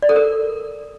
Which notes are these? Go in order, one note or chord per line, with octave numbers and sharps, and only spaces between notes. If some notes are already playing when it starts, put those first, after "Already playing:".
D5
A4
A#4